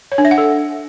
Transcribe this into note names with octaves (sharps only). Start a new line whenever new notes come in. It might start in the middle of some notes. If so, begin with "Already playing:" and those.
C#5
D4
E5
F#5
A4